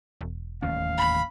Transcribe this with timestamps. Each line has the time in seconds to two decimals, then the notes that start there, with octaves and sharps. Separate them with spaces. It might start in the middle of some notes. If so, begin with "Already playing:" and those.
0.21 E1
0.62 A1 D#2 C#4 F5
0.98 B5